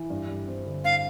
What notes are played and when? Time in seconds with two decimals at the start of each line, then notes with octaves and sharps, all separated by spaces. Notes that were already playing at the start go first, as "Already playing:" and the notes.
Already playing: E3
0.10 G2
0.28 G3
0.47 C4
0.66 D3
0.84 G2 F5